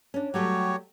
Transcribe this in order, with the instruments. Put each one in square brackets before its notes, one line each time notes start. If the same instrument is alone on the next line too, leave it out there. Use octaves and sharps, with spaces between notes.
[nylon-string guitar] C#4 D4
[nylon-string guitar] F#3 G3 A3 [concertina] F#4 G4 C#5